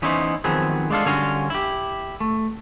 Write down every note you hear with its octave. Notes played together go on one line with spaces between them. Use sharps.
E3 B3 C#4 D#4 E4 C5
D#3 F3 F#3 B3 C4 G#4
G#3 D4 F4 A4 F5
D3 G3 C#4 F4 F#4 F5
E4 G4
A3